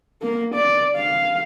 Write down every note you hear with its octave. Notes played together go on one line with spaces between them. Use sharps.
A#3
D5
F5